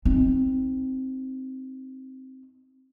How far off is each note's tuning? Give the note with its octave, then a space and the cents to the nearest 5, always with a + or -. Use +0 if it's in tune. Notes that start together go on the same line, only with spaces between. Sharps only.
C4 +0 D#4 +15